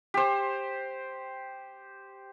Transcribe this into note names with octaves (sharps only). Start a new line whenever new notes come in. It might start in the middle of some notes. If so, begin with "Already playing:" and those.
G4 C5